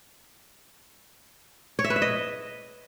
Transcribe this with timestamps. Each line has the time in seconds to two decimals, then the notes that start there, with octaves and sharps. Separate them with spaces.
1.79 C#5
1.84 E5
1.90 B4
1.96 E5
2.02 D#5